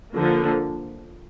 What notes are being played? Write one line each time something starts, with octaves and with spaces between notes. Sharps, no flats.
D3 F3 A#3